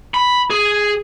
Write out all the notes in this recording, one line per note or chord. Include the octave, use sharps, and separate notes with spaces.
B5
G#4